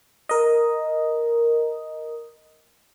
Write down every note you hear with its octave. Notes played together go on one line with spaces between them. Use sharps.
A#4 D#5